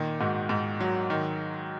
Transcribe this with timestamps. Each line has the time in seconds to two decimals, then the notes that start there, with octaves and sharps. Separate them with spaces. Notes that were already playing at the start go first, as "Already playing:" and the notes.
Already playing: A#2 D#3
0.20 G#2 F#4
0.49 G#2
0.80 F#3
1.10 D#3